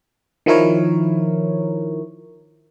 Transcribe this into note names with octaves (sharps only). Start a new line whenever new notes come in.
D#3 F3 E4 A#4 C#5